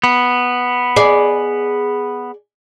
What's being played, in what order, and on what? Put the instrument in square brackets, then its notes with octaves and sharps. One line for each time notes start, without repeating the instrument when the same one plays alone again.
[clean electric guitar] B3
[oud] G#4 D5